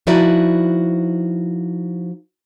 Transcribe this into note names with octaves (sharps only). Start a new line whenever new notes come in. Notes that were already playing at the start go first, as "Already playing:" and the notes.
F3 D#4 E4 F#4 B4 D5